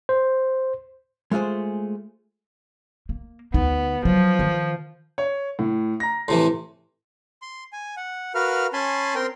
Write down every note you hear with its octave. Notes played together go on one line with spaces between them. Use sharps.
C5
G#3 A3 F4 G#4 C5
A#3
D2 B3 D#4
F3 F#3
D#3
C#5
A2
A#5 A#6
A2 C3 E3 C6
C6
G#5
F#5
F#4 A#4 B4 F5 F6
C#4 G#5 A5 B5 C6
C4 A#4 G5 C6